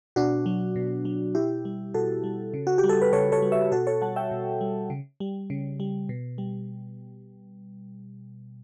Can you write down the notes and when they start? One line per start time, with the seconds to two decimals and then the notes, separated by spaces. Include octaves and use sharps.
0.16 B2 D4 F#4
0.46 F#3
0.76 B2
1.05 F#3
1.35 B2 E4 G4
1.65 G3
1.94 B2 F#4 A4
2.24 G3
2.54 C#3
2.67 F#4
2.78 G4
2.84 G3
2.89 A4
3.02 B4
3.12 C#3 A4 C#5
3.32 A4 C#5
3.42 G3
3.52 C#5 E5
3.72 B2 F#4 A4
3.87 A4 C#5
4.01 G3 F#5 A5
4.16 E5 G5
4.31 B2
4.61 G3
4.90 C#3
5.20 G3
5.50 C#3
5.80 G3
6.09 B2
6.38 G3